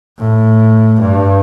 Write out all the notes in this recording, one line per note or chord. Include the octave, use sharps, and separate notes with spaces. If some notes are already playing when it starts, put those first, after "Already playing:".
A2
G2